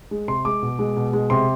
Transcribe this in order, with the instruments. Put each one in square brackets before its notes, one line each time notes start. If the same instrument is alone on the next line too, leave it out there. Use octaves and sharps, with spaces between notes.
[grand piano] G#3
C3 C6
G#3 D6
B2
G#3
B2
G#3
C3 C6